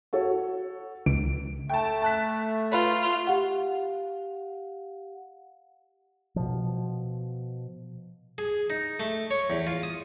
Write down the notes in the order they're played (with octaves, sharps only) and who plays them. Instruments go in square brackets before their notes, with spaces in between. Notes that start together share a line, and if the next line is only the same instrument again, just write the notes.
[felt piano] F#4 A4 C#5
[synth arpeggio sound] C#2 [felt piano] D7
[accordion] A3 [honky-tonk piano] G5 A5
[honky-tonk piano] A5 F#6 B6
[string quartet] F4 [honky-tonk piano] B4
[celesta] G4 F5 F#5
[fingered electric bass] B2 F3
[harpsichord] G#4
D#4
A3
C#5
E2
F4
D#6